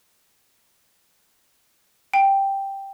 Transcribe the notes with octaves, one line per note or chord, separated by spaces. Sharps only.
G5